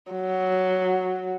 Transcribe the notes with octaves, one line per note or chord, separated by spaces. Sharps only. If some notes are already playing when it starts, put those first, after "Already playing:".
F#3